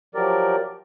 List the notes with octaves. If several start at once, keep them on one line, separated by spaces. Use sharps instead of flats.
F3 F#3 G4 A#4 D5